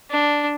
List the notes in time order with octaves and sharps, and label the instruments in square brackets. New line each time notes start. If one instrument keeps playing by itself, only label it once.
[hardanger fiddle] D4